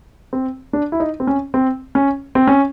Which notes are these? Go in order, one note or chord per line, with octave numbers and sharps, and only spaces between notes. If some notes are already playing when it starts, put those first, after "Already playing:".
C4
D4
E4
D#4
C4
C#4
C4
C#4
C4
C#4